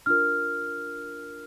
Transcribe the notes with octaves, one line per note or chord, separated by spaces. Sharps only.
D4 F4 A#4 F6